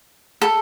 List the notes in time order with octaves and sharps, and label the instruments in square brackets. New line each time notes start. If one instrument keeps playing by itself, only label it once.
[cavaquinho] A4